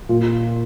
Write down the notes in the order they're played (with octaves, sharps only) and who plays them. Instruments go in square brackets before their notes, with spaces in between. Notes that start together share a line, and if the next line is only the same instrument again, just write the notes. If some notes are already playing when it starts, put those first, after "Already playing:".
[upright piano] A#2